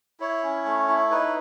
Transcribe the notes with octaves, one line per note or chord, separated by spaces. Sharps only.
E4 C#5
C#4
A3
E4
D#4 B4